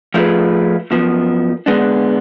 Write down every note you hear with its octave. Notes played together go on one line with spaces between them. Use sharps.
F3 A3 F4 G#4 B4
F#2 F3 B3
D3 G#3 B3 D4